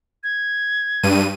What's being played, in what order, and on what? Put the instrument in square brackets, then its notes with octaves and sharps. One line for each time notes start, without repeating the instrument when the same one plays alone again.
[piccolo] G#6
[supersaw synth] G2 D#7